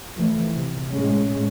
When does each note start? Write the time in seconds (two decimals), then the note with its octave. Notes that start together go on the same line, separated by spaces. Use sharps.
0.16 E3 F3 A3
0.53 C3
0.91 A2 G#3 C#4